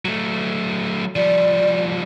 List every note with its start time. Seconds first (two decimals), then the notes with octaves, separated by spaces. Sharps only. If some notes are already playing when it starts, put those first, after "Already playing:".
0.05 F#3 A3
1.16 F3 G3 D5